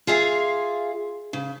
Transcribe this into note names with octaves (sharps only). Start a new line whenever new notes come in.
F4 G#4 E5 F5
C#3